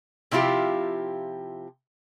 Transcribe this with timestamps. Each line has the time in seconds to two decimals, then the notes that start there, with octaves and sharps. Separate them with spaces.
0.31 C3 F3 E4 F4 G4